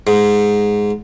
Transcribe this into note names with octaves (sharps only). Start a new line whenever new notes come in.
G#2